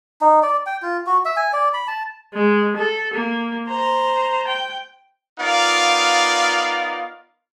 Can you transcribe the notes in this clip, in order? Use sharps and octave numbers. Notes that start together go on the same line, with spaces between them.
D#4
D5
G5
F4
F#4
E5
G#5
D5
B5
A5
G#3
A4
A#3
C5 A#5
G5
B3 D#4 F4 A#4 D5 F5